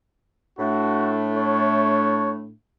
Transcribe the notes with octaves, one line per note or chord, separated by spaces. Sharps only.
A2 A3 D4 F#4
C#5